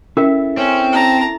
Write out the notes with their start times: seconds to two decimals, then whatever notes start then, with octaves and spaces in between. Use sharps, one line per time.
0.17 C#4 E4 A4 A#4 E5 G5
0.57 C4 C#4 C#5 G#5
0.93 A5 A#5